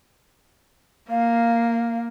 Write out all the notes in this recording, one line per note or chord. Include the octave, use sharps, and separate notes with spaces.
A#3 F5